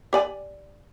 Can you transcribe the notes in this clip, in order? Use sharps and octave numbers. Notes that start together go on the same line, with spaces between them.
G4 D5 G#5